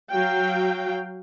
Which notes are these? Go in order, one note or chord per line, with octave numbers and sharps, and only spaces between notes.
F#3 F#4 F5 G5